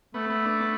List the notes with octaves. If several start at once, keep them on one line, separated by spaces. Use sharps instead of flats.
A3 B3
B3
D4
B3